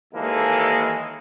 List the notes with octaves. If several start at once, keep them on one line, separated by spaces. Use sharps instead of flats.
D#2 E3 G#3 A#3 A4